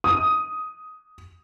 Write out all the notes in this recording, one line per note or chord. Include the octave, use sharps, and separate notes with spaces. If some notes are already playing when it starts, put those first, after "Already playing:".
D#6